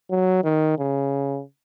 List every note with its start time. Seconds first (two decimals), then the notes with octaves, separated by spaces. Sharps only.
0.10 F#3
0.44 D#3
0.78 C#3